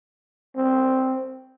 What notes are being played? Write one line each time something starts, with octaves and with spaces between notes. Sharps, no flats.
C4